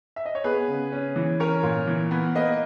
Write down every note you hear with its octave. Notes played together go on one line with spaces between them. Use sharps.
E5
D#5
C#5
B3 G#4 B4
C#3
C#4
E3
C#4 A#4 C#5
A#2
E3
B3
A#3 B4 D#5